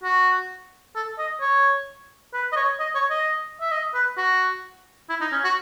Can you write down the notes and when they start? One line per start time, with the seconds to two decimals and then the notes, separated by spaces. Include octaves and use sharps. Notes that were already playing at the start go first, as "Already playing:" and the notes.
0.03 F#4
0.95 A4
1.18 D#5
1.41 C#5
2.33 B4
2.52 D#5
2.56 C#5
2.79 D#5
2.95 C#5
3.10 D#5
3.61 E5
3.71 D#5
3.94 B4
4.17 F#4
5.09 E4
5.21 D#4
5.32 C#4
5.44 F#4